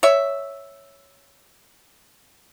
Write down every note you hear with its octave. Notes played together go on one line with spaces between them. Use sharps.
C#5 E5